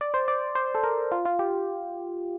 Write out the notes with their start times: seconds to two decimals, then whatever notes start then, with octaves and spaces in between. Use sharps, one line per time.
0.01 D5
0.14 C5
0.28 D5
0.55 C5
0.75 A4
0.83 A#4
1.12 F4
1.25 F4
1.39 G4